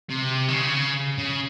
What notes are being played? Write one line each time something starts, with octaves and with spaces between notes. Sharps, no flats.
C3
D#3
C#3
C#3